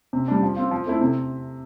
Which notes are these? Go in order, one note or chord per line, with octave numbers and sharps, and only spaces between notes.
C3
G3 D4
F3
C4 F4
F3
A3 C4 E4
C3